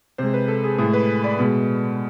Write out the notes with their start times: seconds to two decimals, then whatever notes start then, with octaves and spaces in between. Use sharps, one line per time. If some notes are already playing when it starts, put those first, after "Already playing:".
0.18 C3 G#3 C5
0.34 B4
0.48 A4
0.64 G#4
0.78 A2 G#3 G#4
0.93 B4
1.24 D5
1.39 B2 G#3